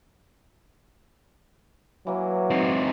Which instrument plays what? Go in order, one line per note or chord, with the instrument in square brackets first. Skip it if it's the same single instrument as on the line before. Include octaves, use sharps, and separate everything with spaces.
[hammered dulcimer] E3 A#3 [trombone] F#3
[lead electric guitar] C4 D#4